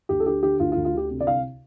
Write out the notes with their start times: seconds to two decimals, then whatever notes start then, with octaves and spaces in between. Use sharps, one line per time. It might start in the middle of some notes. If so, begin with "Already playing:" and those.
0.09 D2 G4
0.20 A4
0.26 D3 G4
0.43 D3 G4
0.60 D2 F4
0.72 F4
0.76 D2
0.85 F4
0.94 D3 G4
1.10 C3
1.20 D5
1.26 C2 F5